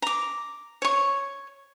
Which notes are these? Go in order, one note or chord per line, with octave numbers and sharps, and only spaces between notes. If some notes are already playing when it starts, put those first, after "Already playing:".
A#5 D6
C#5 C#6